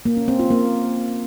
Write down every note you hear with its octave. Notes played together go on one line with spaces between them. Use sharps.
A#3
C#4
C4
F4
A#3